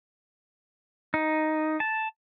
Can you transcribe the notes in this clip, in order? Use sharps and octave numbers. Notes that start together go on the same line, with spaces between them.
D#4
A5